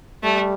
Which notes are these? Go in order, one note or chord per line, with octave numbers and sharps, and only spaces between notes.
G3 A3